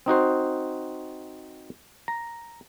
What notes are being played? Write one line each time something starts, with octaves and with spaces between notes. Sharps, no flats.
C4 D#4 F#4 C5
A#5